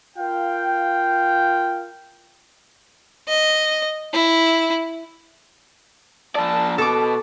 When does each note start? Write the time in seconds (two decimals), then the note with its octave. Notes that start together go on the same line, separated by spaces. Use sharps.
0.17 F4 A#4 F5 G5
3.28 D#5
4.14 E4
6.35 F3 D5 A5
6.78 B2 A4 D6